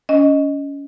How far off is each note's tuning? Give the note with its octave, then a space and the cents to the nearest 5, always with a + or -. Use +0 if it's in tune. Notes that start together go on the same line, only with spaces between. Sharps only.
C#4 +25 D#5 +0